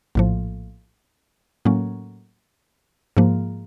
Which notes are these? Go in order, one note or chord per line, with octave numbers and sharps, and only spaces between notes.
A#1 A2 F3
A2 F#3 A#3 C#4
G#2 F3 A#3